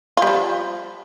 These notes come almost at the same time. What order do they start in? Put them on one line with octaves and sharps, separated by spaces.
F4 G3 F3